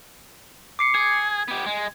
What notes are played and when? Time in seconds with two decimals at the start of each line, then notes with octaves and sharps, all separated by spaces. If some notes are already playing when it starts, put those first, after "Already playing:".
0.79 D6 C7 C#7
0.94 G#4 G#6
1.48 B3 G4
1.66 G#3